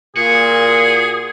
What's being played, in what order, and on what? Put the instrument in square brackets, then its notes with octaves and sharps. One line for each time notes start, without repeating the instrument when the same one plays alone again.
[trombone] A#2 [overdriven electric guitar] F#4 [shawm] G#4